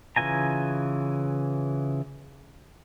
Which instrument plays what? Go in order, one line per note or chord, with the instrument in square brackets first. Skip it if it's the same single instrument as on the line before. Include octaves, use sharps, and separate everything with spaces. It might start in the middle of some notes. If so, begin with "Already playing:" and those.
[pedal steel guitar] C#3 E3 F4 G#5 A#5